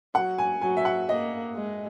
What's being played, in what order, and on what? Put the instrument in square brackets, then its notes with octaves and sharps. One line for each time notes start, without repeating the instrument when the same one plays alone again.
[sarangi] F#3 [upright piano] F#5
[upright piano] G#5
[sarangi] F#3 [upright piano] G#5
[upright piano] E5
F#5
[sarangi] A#3 [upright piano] D#5
[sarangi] G#3